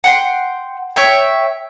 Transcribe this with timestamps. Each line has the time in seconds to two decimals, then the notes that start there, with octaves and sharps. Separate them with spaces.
0.04 F#5 G5 C6
0.96 C#5 E5 G5